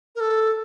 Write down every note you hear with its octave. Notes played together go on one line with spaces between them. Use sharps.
A#4
A4